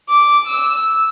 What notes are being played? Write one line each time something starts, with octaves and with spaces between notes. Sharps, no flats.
D6
E6